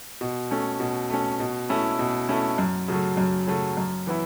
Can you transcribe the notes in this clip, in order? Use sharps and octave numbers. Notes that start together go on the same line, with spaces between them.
B2
A3 C#4
B2
A3 C#4
B2
A3 C#4 E4
B2
A3 C#4 E4
F#2
C#3 F#3 A3
F#2
C#3 F#3 A3
F#2
E3 B3 E4